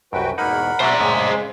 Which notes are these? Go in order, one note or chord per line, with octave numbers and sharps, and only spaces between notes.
C2 F#2 F#4 B4 G5
E2 G#2 B2 A#3 D#4 A#4 F#5 B5
B2 F#3 C5 D5 E5 A#5
F#2 A2 C#3 G#3 D5 D#5